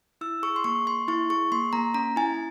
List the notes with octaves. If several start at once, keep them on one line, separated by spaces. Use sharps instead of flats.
E4 E6
G#4 C#6
C6
A#3 C#6
A#3 C6
E4 C#6
G#4 C#6
A#3 C6
A#3 A#5
C#4 A#5
E4 G#5